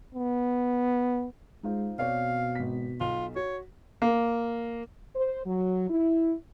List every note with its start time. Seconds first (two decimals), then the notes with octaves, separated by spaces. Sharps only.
0.15 B3
1.63 G#3 D#4 F4 C5
1.99 B2 C4 C#5 D5 F5
2.55 G#1 B6
3.00 B1 F4
3.36 F#4 C#5
4.02 A#3
5.16 C5
5.46 F#3
5.90 E4